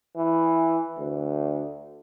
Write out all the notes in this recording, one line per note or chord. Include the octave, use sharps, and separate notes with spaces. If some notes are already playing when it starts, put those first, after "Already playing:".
E3
D2